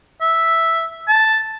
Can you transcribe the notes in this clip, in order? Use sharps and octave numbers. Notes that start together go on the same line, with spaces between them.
E5
A5